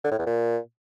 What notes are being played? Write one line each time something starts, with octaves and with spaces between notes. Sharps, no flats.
D3
A2
E2
A#2